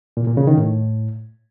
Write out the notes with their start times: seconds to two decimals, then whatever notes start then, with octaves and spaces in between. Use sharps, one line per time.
0.17 A#2
0.27 A#2
0.37 C#3
0.47 D#3
0.57 A2